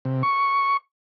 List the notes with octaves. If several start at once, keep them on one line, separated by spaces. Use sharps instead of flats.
C3
C#6